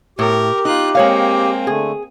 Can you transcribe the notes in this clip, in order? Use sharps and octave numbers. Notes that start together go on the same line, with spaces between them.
A2 G4 A#4
D#4 F4 F#6
G#3 A#3 C4 C#5 F5
D3 A3 G#4